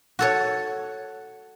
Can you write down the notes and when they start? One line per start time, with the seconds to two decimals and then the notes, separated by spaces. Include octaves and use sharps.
0.19 F#4 A4 C#5